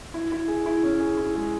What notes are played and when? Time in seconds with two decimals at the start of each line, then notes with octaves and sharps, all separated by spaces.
0.14 E4
0.32 E4
0.48 G#4
0.66 E4
0.83 C#4
1.00 G#4
1.17 E4
1.35 G#3